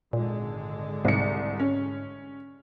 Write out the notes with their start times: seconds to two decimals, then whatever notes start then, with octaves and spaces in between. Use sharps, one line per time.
0.13 G#1 A#2 D3 G#3
1.05 C2 G#2 C#7
1.60 C#4